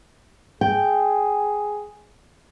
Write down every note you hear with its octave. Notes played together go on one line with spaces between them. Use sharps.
G#4 G5